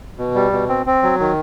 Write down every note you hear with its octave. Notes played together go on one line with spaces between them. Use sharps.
B2
G3
B2
C4
C4
F#3
D#3